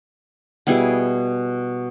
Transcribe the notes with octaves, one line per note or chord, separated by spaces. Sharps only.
B2 G3 E4 G#4